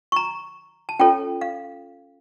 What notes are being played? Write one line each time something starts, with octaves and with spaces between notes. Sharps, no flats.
C#6
A#5
A5
C#4 F4 A4 C#5 G5
F5